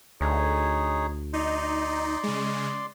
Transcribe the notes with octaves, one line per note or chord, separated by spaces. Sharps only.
D2 D#4 G#4 C#5
D#4 D5 C6
C#3 G#3